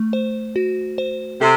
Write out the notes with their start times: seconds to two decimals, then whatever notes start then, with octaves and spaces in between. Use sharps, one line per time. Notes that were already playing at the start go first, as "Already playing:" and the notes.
Already playing: A3
0.13 C5
0.56 F#4
0.98 C5
1.41 C3 A4